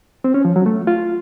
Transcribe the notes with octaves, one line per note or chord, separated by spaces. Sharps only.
C4
C#4
F3
F#3
A3
F4